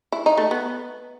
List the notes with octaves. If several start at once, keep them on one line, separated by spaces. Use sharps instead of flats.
E4
D#4
A3
B3